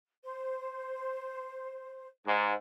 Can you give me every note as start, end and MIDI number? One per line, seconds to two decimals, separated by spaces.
0.24 2.08 72
2.25 2.53 44
2.25 2.54 72